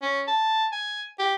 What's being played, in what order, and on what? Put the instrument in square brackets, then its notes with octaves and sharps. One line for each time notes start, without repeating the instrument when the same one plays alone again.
[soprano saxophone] C#4
A5
G#5
G4